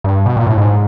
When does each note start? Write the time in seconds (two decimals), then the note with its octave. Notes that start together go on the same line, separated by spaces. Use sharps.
0.04 G2
0.26 B2
0.37 A#2
0.47 A2
0.58 G#2